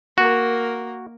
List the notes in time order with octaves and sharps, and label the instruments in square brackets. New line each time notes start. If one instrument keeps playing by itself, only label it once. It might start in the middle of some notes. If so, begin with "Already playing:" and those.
[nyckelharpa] A#3 A#4 [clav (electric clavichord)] F#4